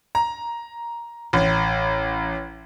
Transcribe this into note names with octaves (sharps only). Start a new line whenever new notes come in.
A#5
A1